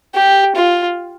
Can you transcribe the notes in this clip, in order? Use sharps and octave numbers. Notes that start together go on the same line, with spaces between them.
G4
F4